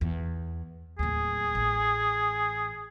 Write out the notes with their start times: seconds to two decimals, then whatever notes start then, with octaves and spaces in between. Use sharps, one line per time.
0.01 E2
0.99 D1 D#2 G#4
1.55 A1